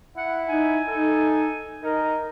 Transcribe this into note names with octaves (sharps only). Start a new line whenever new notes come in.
E4 F#5
D#4 G#5
D#4 A4
D#4 A#4